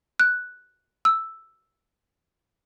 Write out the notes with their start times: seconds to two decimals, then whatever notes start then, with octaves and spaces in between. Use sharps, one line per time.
0.20 F#6
1.05 E6